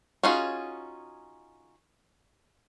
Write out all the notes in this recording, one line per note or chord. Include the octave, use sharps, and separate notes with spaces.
C#4 D#4 F4 F#4 G#4